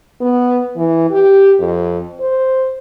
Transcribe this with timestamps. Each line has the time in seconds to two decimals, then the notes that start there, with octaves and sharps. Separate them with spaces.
0.21 B3
0.77 E3
1.11 G4
1.60 F2
2.20 C5